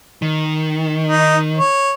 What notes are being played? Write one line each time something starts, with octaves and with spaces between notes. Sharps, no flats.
D#3
D#4
C#5